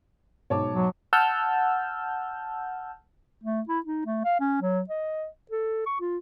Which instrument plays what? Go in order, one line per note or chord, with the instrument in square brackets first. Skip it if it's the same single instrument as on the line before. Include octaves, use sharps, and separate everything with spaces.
[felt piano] B1 G#2 [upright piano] C#5 A5 D6
[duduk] F#3
[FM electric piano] F#5 A5 E6 F6 G6
[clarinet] A3
E4
D#4
A3
F5
C#4
F#3
D#5
A4
C#6
F4